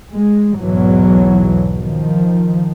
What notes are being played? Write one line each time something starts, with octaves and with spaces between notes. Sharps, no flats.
G#3
B1 E2 G#2 B2 E3 F#3
D#3 F3